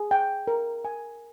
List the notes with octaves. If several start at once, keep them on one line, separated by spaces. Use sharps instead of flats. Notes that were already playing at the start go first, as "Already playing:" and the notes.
Already playing: G#4
G5
A#4
G#5